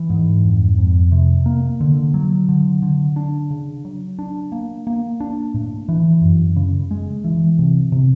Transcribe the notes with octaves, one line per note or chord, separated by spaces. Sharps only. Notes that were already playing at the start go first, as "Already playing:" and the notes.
Already playing: E3
G#2
F2
F2
C3
A#3
D3
F#3
D3
D3
D4
C#3
F#3
D4
A#3
A#3
D4
A2
E3
F#2
C#3
G#3
E3
C3
C3